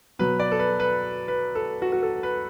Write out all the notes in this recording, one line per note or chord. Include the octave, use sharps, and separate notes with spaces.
B2 F#3 B4
D5
A4
B4
B4
B4
A4
F#4
F#4
A4
B4